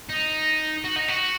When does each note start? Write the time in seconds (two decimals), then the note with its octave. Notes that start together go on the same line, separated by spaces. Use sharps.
0.10 D#4
0.84 F#4
0.96 D#4
1.08 F#4